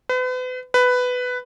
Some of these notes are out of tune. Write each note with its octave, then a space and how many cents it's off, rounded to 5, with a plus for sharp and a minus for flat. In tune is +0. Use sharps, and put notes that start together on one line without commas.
B4 +40
B4 +10